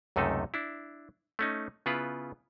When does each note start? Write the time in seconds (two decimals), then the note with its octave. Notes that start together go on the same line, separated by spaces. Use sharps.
0.16 C#2 F#2 C3 A3 D#4 A4
0.54 D4 E4
1.39 A3 C#4 D#4
1.86 C#3 B3 E4 F4 B4